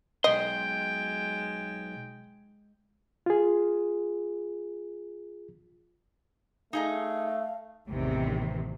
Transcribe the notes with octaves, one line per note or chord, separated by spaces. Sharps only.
B1 G#3 D#5 G5 C6
F4 G#4
A3 D#4 G#4 D#5 F5
A1 E2 C3 D#3 E3